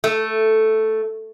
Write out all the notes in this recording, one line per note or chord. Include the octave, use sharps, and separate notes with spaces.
A3